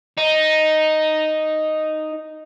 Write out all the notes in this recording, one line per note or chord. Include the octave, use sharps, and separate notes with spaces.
D#4